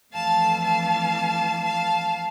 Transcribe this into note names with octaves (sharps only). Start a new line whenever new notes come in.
F2 E3 A3 F5 A5
F5 A5
F5 A5